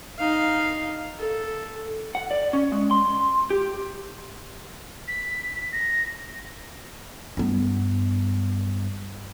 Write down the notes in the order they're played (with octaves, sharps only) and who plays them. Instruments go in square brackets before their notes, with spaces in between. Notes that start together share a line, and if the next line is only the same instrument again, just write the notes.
[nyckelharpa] D#4 F5
A4
[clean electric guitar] F#5
D5
C#4
G#3
C6
G4
[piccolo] B6
A#6
[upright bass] G2 B3